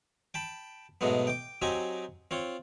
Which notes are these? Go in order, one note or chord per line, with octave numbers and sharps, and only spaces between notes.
G5 A5 B5
G#2 B2 F#3 G#3 A3 B3
G5 D6
F#3 C4 D#4 F#4 G4 G#5
C4 F4 C#5